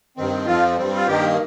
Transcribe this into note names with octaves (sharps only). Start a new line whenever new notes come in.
G2 D#3 C4
F2 F3 C4 F4
G2 G3 C4
F4
G2 D#3 A#3 G4